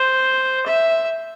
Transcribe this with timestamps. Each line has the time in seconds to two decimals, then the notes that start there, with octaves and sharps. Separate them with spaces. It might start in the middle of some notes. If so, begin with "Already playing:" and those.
Already playing: C5
0.66 E5